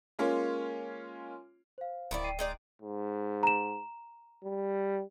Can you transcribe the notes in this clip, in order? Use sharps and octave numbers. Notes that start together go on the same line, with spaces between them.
G#3 A#3 C#4 F4 C#5
C5 F5
D1 D#3 E4 D5
G5 C7 D#7
G#3 D#4 D5
G#2
A#5 E7
G3